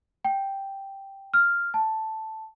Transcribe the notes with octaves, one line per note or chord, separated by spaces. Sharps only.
G5
F6
A5